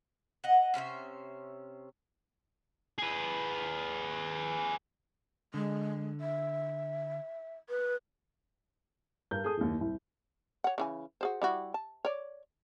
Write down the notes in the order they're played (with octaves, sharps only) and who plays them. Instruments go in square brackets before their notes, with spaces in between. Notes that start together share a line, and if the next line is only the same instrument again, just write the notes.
[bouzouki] D#5 F#5
C3 C#4 C5 E5
[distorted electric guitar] G#4 B4
[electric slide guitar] D3 [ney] G#3
[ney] E5
B4
[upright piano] G2 A#4 G6
G#4 A4 D#6
F#1 D#2
C2
[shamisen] C#5 F#5
C#3 E3 G#5
F#4 G#4 C5
G3 E4 F#4
A5
C#5 D5